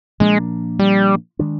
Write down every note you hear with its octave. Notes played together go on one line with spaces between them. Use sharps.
A#2 F3 G#3 A#3 D4
G3
D#3 G#3 D4